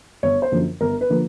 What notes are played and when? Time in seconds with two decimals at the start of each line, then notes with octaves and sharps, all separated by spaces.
0.23 G1 C#5
0.42 C5
0.52 F#2 D3 F3 A#3
0.81 G1 A#4
1.01 B4
1.10 D3 F3 A#3